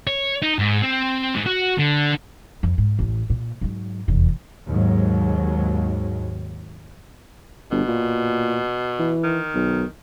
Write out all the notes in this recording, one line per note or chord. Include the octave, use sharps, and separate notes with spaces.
C#5
D#4
G#2
C4
G#2
F#4
D3
F2
G#2
A1 F2
A#2
G#2 F#3
F1 E2
D#2 G#2 F#3
G1 B2
A#2
E3
D#3
B1